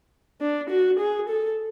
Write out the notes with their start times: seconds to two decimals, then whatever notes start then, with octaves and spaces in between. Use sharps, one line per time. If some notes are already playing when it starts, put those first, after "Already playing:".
0.41 D4
0.70 F#4
0.99 G#4
1.29 A4